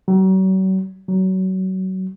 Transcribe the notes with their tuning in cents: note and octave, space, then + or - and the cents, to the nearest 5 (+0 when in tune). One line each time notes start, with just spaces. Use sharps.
F#3 +40
F#3 +25